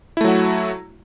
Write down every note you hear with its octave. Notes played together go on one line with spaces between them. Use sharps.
F#3 A3 E4 F#4